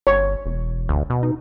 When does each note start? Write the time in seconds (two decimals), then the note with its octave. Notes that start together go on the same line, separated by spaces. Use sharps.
0.07 G1 C#5
0.46 E1
0.89 D2
1.10 B2
1.23 D#4